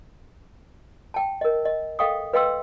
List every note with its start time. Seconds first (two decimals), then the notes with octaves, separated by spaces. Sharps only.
1.14 G5 A5
1.41 A#4 D#5
1.65 D#5
1.99 A4 D#5 F5 G5 C#6 D#6
2.34 B4 D#5 F5 G5 C6 E6